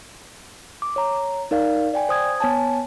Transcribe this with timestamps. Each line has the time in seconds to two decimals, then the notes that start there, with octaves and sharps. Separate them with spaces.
0.82 D6
0.96 C#5 A#5
1.51 D#4 A#4 D5 F5
1.94 D5 G5 G#5
2.09 C5 D#6 G#6
2.40 B3 C#5 G#5 A5